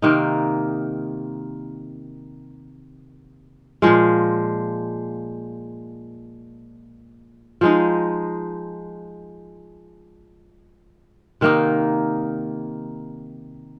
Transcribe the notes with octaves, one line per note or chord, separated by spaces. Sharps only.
C3 D#3 A#3 D#4
A#2 F3 G#3
F3 G#3 D#4
C3 D#3 A#3 D#4